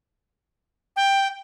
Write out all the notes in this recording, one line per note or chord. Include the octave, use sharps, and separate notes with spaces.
G5